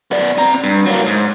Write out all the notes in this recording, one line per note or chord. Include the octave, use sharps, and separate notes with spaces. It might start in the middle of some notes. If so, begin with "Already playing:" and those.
B3 D5
C4 A#5
G2
F#3 A#3
G#2